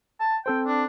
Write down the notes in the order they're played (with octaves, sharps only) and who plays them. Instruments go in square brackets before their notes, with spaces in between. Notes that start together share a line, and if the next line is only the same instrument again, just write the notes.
[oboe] A5
[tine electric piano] C4 A4 C5 [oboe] G5
[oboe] D4